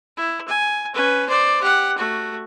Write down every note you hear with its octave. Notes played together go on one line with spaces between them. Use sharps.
E4
G#5
C#4 B4
C5 D5
G4 F#5
A3 F#4